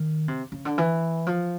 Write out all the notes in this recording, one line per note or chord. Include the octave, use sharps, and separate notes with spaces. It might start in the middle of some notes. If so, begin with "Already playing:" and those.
Already playing: D#3
C3
C#3
D3
E3
F3